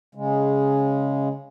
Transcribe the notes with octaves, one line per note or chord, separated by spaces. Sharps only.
C#3 G#3